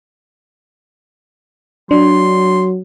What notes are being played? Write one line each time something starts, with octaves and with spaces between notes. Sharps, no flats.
F#3 D4 C6